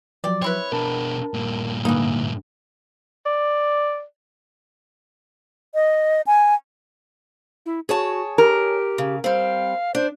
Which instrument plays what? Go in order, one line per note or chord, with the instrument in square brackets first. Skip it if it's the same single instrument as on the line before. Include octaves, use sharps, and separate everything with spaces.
[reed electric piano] F3 F#3 [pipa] G4 D5
[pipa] C4 E4 B4 [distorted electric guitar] C#5
[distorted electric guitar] B2 D4 [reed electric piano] A#4 A5
[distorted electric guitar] G2 A#2
[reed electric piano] G#2 D3 [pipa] E3 D#4 [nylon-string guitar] A#3
[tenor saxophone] D5
[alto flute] D#5
G#5
[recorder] E4
[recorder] F#4 [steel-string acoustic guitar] G#4 C#5 A5
[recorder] G4 [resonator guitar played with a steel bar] A#4
[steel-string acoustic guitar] C#3
[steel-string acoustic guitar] G3 C4 [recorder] F5
[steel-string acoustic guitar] D4 [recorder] C5